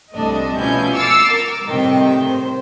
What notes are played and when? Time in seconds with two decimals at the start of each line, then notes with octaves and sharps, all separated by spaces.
0.13 C2 A3 D4 D#5
0.58 B2 F3 C#4 E4 G#5 G6
0.95 D6 E6 F6 A6 C7 C#7
1.32 A#4 D6
1.67 A2 C3 D#3 G3 G5
2.26 C5